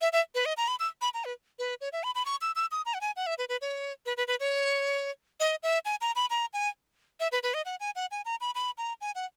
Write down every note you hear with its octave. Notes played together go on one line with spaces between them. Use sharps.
E5
E5
B4
D#5
A#5
B5
E6
B5
A#5
B4
B4
C#5
E5
B5
B5
C#6
E6
E6
D#6
A#5
F#5
G#5
F#5
E5
B4
B4
C#5
B4
B4
B4
C#5
D#5
E5
G#5
A#5
B5
A#5
G#5
E5
B4
B4
D#5
F#5
G#5
F#5
G#5
A#5
B5
B5
A#5
G#5
F#5